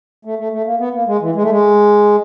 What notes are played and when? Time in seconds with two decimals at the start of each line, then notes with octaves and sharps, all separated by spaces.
0.25 A3
0.39 A3
0.53 A3
0.66 A#3
0.79 B3
0.94 A#3
1.07 G#3
1.21 E3
1.35 G#3
1.43 A3
1.50 G#3